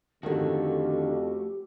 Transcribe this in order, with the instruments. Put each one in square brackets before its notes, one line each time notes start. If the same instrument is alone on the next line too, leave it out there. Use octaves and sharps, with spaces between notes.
[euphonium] F2 [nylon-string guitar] D3 D#3 [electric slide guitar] A3 C#4 F#4 [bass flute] G4